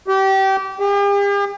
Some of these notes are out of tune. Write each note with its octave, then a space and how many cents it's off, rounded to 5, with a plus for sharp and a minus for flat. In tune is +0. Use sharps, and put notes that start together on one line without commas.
G4 -25
G4 +45